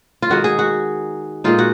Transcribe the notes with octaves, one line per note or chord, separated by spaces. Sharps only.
F4
D#3 G#3 D#4 F#4
G#4
F#4
A#2 G#3 D#4 F4
F#4